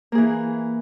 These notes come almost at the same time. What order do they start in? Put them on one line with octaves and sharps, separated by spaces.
A#3 G#4 E3